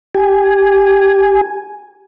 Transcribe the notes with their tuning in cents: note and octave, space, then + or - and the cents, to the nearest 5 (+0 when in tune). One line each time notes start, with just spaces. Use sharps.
G4 +0 G#5 +0